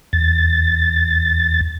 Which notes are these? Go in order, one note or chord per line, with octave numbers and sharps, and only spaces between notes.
E2 A6